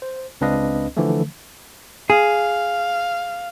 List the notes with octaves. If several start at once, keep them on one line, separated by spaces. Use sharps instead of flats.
C5
C#2 C4 D4 B4 D#5 F5
D3 E3 F3 A3
G#4 F5